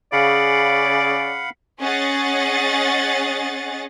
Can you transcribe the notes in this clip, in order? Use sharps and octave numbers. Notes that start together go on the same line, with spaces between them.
C#3 D5 F5 F#5 B5
C#4 G#4 D#5 F#5 A6